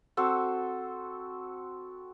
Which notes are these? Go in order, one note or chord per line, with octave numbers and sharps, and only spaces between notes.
C4 F#4 A4